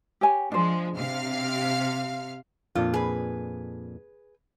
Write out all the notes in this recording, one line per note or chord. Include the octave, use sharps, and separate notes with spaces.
G4 C#5 G#5
F3 G#3 D4 C5
C3 F5 F6
F2 A#2 D4 F4
G#4 B4